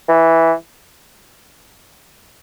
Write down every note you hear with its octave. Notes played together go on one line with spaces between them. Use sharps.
E3